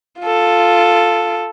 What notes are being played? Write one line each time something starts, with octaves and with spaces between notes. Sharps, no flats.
F4 A4